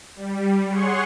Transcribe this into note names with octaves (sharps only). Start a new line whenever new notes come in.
G3
G#4 C#5 F#5 C6 C#6